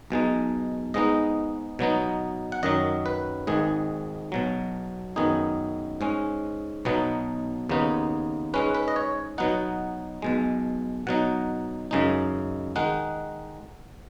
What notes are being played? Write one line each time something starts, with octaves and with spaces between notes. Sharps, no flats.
B1 B2 G#3 D#4
G#2 G#3 B3 D#4 D#5
B2 F#3 B3 D#4
F#5
F#2 D#3 F#3 D#5
B4
G#1 G#2 D#3 G#4
B1 B2 F#3
F#2 D#3 B3 D#4 G#4
G#2 G#3 C#4
B1 B2 F#3 B3 D#4
D#2 C#3 B3 D#4
G#2 G#3 C#4 B4
B4
D#5
C#5
B2 F#3 B3 D#4 F#5
B1 B2 G#3
B2 F#3 D#4 F#5
F#2 C#3 G#3 D#4
D#3 G#3 D#4 F#5